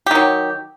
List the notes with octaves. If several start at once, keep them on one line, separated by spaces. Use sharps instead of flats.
D#3 F#3 G4